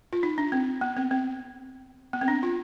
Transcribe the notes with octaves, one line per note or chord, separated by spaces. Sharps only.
F4
D#4
D4
C4
B3
C4
C4
B3
C4
D4
F4